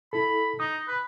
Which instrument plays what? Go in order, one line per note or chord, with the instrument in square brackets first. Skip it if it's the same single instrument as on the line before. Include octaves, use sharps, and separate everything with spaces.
[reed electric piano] E4 A4 [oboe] B5
[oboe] D#4 [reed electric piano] D#6
[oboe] B4